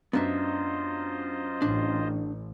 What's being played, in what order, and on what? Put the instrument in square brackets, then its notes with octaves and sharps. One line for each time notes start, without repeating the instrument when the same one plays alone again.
[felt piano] F#2 [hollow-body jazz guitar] B3 D4 E5 [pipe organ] F4 C5 D#5
[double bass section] A1 [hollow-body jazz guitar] D4